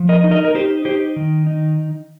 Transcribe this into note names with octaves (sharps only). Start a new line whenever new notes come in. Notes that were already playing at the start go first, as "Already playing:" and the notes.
Already playing: F3
A#4 D#5
D#4
A#4 D#5
A#4
D#4 G4 C5
D#4 G4 C5
D#3
D#4